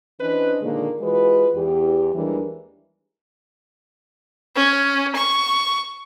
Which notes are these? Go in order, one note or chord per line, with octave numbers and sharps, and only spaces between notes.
E3 C#4 D4 B4 C5 D#5
A#2 D3 D#3 G#3 A#3
E3 G#3 F4 F#4 B4
E2 G4
D#2 E3 G3 G#3 D4 A#4
C#4
C#6